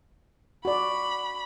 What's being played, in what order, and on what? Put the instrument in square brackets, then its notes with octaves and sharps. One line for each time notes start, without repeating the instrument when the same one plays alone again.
[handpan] F#4 D5 [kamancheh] B5